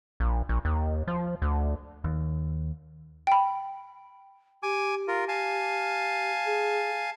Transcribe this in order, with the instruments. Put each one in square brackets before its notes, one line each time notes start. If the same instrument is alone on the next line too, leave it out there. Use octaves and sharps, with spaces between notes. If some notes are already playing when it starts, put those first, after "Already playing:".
[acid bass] A#1
A#1
D#2
F3
D2
[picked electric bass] D#2
[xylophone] G5 B5
[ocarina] G4 [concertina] G#5 D6
[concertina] F4 A#4
F5 G#5 A5
[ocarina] G#4